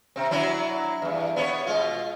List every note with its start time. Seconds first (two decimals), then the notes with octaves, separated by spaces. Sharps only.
0.16 C3 C4
0.31 F#3 D4 E4
1.02 E2 G2
1.36 B3 G#4 C#5
1.66 B2 G#3 F4